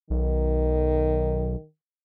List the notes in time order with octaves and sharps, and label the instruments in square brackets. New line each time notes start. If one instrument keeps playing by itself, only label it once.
[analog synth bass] B1 [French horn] D#3